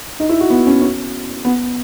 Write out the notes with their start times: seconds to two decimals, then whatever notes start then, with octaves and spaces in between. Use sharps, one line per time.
0.20 D#4
0.29 E4
0.41 F#4
0.50 B3
0.67 C#4
0.82 C#4
1.45 B3